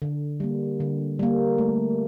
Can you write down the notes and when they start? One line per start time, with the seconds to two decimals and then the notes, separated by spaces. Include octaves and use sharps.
0.02 D3
0.40 G3 A#3
0.80 D3
1.19 G3 A#3
1.58 A3